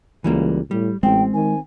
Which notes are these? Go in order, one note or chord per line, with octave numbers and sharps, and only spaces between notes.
C#2 E3 G3 A#3
A2 G3
A1 G#3 C4 G5
D#3 G#5